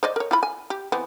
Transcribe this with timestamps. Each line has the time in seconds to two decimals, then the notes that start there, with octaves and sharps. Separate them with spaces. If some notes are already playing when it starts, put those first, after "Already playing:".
0.03 C5 D5 D#5
0.16 A#4 C#5
0.31 E4 F4 B5
0.43 G#5
0.70 G4
0.92 E3 B3 C4